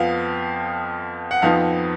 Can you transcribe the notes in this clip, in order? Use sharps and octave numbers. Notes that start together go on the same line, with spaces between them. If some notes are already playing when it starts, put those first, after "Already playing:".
Already playing: F2 F3 B3 F5
F#5
F2 F3 B3 D#4 F5